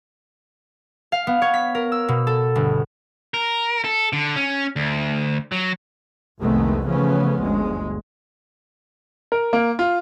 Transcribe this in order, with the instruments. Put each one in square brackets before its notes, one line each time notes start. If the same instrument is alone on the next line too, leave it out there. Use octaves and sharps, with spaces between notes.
[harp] F5
B3
C#5
B6
A#4
E6
B2
A4
G1
[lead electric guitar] A#4
A4
D3
C#4
D2
F#3
[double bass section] C2 F2 D#3 G#3 A3 B3
C#3 E3 F3 A3 B3 C#4
G1 D2 G#3
[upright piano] A#4
A#3
F4